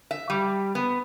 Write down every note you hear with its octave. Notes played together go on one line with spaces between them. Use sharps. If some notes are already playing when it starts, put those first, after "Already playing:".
E5
G3
B3